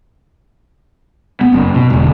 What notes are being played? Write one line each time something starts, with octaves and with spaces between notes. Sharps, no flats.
B3
F#1 F#2
B2
E1 D3